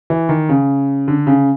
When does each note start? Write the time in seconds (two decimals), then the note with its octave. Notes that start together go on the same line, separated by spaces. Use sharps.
0.10 E3
0.29 D#3
0.49 C#3
1.08 D3
1.27 C#3